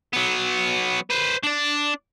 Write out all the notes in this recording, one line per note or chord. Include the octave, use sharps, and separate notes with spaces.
F#3 B3
B4 C5
D4 D5